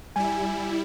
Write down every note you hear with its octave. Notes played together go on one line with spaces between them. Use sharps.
G3 E4 G#5